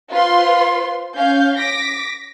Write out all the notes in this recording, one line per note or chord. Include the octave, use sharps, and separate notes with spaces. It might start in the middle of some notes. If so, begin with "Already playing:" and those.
F4 B4 C5 C6
C#4 F5 G6
D6 A#6 B6